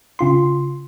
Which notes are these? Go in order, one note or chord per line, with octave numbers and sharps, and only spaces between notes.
C#3 F4 C6